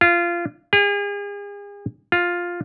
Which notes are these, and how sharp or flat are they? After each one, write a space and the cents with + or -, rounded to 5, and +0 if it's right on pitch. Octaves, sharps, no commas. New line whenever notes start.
F4 -20
G#4 -40
F4 +5